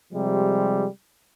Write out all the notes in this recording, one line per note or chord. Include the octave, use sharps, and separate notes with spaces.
C3 F3 G3 G#3